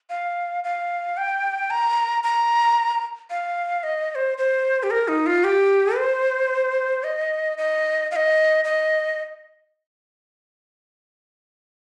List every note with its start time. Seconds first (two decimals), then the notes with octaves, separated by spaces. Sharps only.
0.10 F5
0.64 F5
1.17 G5
1.70 A#5
2.24 A#5
3.30 F5
3.83 D#5
4.10 D#5
4.15 C5
4.38 C5
4.83 G4
4.91 A#4
5.08 D#4
5.26 F4
5.44 G4
5.97 C5
7.04 D#5
7.58 D#5
8.11 F5
8.16 D#5
8.65 D#5